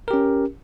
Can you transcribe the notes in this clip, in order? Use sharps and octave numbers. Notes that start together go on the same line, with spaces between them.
C#4 G4 A#4